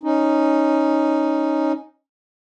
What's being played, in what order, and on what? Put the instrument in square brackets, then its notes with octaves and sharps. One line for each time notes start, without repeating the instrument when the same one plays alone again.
[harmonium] C#4 D#4